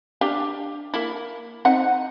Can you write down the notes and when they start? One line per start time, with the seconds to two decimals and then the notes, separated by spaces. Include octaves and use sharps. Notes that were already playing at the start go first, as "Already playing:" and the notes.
0.21 D4 G4 F5
0.94 A#3 E4
1.65 C4 D#4 F#5